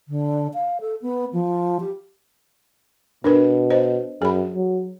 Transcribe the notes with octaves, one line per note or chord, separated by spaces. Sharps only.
D3
F5
A4
B3
F3
G4
B2 D4 A#4 B4
C5 D#5
F#2 G#4 B5
F#3